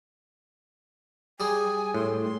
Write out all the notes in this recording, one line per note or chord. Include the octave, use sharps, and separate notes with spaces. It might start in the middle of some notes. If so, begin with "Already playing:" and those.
G3 G#4 G#5
A2 C6
C6